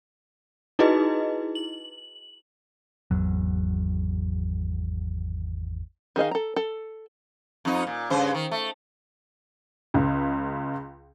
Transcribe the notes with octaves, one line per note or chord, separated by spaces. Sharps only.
D#4 E4 F#4 G#4 B4 D#5
F#7
G#1 E2 F#3
D#3 G#4 D#5 F5
A4 A#5
A4
F2 D#4
A#2
G2 C#3 C5
D#3
A3
C#2 C#3